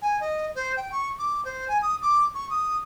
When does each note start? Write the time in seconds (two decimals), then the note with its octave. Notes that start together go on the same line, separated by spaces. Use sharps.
0.02 G#5
0.20 D#5
0.55 C5
0.77 G5
0.92 C#6
1.19 D6
1.45 C5
1.68 G#5
1.82 D#6
2.02 D6
2.35 C#6
2.50 D#6